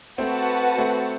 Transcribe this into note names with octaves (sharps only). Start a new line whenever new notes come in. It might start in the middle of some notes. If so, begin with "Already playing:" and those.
A3 C4 F#4 B4 F#5 A5
A3 C4